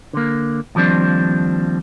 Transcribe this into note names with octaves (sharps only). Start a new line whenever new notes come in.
D3 A#3
D#2 F3 G3 C4 D4